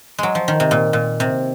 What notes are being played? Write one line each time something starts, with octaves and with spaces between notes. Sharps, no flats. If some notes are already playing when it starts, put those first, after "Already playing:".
F#3 G#3
F3
D#3
C3
A#2
A#2
C3